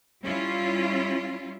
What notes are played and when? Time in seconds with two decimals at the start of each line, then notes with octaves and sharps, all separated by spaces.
0.23 G3 C#4 E4 F4